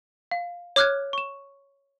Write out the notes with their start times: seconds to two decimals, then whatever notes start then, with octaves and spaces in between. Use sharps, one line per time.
0.31 F5
0.76 C#5 D6 F6 F#6 G#6
1.13 C#6 E7